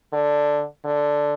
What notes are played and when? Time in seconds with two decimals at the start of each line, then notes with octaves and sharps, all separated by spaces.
0.13 D3
0.85 D3